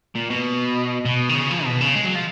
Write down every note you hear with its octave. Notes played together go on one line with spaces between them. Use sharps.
A#2
B2
B2
D#3
C#3
F3
B2
C#3
G#3
F#3
F3